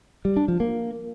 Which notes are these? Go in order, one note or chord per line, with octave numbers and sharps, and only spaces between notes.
G3
D4
F3
A#3